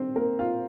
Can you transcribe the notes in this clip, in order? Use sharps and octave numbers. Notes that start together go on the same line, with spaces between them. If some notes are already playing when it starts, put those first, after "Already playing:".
Already playing: D#3 G3 C4 D4 C5
A#3 A#4
F4 F5